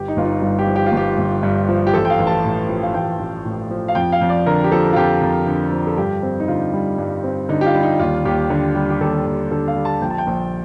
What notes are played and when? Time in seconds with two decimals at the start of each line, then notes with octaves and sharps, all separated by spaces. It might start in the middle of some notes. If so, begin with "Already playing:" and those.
Already playing: G1 G4
0.08 D#4
0.17 G1 F4
0.25 D#4
0.42 G2 F4
0.59 G4
0.67 F3
0.76 G4
0.86 F4
0.92 G1 G4
1.18 G1
1.43 G2
1.69 F3
1.87 G4
1.93 A1 A4
2.05 G5
2.10 F5
2.19 A1
2.27 A5
2.44 A2
2.69 F3
2.83 F5
2.94 A1 G5
3.19 A1
3.45 A2
3.71 F3
3.88 F5
3.95 F2 G5
4.12 F5
4.21 F2
4.29 D5
4.46 D3 A#4
4.64 G4
4.71 F3 A4
4.93 F4
4.96 F2 G4
5.22 F2
5.47 D3
5.72 F3
5.87 A4
5.97 G2 G4
6.23 C4
6.40 D#4
6.48 D3 F4
6.73 G3
6.98 G2
7.24 C4
7.49 D3 D#4
7.61 G4
7.66 F4
7.74 G3
7.83 D#4
7.99 D#2 F4
8.25 D#2 G4
8.50 D3
8.75 G3
8.90 G4
9.00 D#2 A4
9.26 D#2
9.51 D3 A4
9.68 F5
9.76 G3
9.85 A5
10.01 A#1 G5
10.10 A5
10.18 G5
10.27 A#1